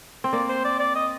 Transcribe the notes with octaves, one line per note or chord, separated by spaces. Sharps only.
C4
A#3 D5
C5
D5
D5
D#5